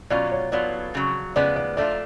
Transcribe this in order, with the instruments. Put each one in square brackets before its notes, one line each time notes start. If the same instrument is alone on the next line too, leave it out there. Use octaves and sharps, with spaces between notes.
[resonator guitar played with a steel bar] B2 F#3 C#4 F4 [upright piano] D5
[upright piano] C#5
[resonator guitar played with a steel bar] A2 F#3 B3 F4 [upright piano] D5
[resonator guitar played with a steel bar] F2 C#3 F#3
[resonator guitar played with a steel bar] C#3 F3 G#3 B3 [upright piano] D5
[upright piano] D5
[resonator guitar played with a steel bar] G#2 F3 A3 D4 F4 [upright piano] D5